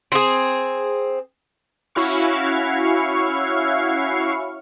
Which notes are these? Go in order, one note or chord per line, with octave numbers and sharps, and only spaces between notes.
C4 G#4
C#4 E4 F#4 F5 C#6